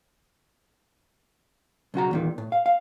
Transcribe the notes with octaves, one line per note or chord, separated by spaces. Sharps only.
B1 C#3 F#4 A#5
E2 A#2 D#3
A2
F5
F5